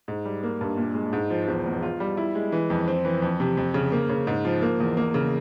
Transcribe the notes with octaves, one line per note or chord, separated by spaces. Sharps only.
G#2
G3
A#3
G2
A#2
G#3
G#2
F3
E1
E2
F4
G3
E4
G#3
E3
F2
C4
E3
F2
C3
F2
C#3
A#3
C#3
G#2
F3
A#3
E2
A#3
C#3